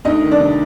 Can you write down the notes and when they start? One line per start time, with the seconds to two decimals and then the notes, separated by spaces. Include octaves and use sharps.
0.05 D2 D#4 D#5
0.22 D#3
0.31 D4 D5
0.40 C3